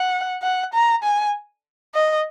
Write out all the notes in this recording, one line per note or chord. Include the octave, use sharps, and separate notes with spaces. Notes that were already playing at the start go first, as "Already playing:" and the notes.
Already playing: F#5
F#5
A#5
G#5
D#5